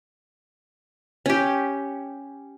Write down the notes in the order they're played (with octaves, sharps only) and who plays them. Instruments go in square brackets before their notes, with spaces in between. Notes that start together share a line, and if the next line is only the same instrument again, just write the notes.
[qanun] C#4 G4